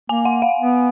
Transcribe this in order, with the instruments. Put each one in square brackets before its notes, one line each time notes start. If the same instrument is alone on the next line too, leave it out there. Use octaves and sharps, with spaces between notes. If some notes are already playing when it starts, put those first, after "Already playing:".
[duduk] A#3 [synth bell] G#5
[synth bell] F#5
F5
[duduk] B3